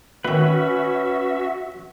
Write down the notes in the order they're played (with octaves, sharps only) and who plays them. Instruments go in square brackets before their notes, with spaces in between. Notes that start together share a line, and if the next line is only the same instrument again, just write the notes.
[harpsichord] A#2 D#3 [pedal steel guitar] C#4 B4 [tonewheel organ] F#4 E5